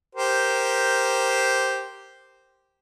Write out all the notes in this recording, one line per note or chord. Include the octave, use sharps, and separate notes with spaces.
G4 A#4 C5